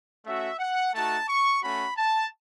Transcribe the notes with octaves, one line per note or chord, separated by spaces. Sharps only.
A3 C#4 F#4 E5
F#5
A3 D#4 F#4 A5
C#6
A3 C#4 F#4 B5
A5